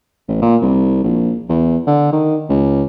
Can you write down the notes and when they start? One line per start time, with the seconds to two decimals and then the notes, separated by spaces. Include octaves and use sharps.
0.28 A1
0.42 A#2
0.62 C2
1.04 A#1
1.49 E2
1.87 D3
2.12 D#3
2.50 C#2